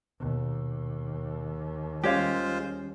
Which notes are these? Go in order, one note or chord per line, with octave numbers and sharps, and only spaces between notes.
D#2 B2
G3 G#3 C#4 F4 G4 C5 C#5 F5